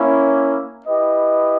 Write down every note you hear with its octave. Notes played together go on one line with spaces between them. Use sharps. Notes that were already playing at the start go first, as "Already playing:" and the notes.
Already playing: A#3 C#4 E4
E4 G4 B4 D#5